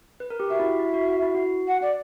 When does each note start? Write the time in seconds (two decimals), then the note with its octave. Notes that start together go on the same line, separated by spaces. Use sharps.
0.20 B4
0.30 A#4
0.40 G4
0.50 F#4 E5
0.60 E4
0.64 F#4
0.80 E4
0.94 F#4
1.08 F#4
1.22 E4
1.35 F#4
1.67 F#5
1.82 D5